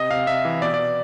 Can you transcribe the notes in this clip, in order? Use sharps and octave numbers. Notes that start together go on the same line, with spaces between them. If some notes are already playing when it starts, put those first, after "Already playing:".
Already playing: C3 D#5
C3 F5
C3 E5
E3
B2 D5
D5
B2